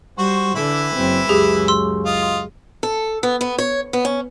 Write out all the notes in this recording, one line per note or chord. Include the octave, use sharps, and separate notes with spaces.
G3 F#4 C5 C#6
D3 E3 E4
F#1 C4
C#2 F#2 G4 G#4
C6 E6
F4 D#5
A4
B3
B3
C#5
B3
C#4